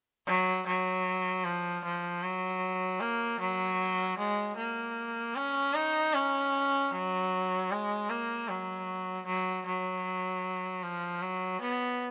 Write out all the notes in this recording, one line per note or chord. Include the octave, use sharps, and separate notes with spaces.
F#3
F#3
F3
F3
F#3
A#3
F#3
G#3
A#3
C#4
D#4
C#4
F#3
G#3
A#3
F#3
F#3
F#3
F3
F#3
B3